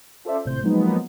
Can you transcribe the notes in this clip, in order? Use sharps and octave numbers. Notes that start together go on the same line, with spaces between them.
C#4 F4 A4 C5 D5 E5
G#1 A2 C3 C5 G6
F3 F#3 G#3 A#3 B3 D#4